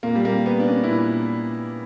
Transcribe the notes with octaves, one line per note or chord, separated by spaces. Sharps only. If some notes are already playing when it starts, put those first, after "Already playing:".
A#2 A#3
G3
A#3
B3
D4
C#4
E4
A#2 D4